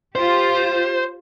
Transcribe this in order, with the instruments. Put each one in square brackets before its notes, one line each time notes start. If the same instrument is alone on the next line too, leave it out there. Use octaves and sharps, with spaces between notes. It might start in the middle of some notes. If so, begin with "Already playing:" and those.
[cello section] F4 G4 [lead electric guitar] C5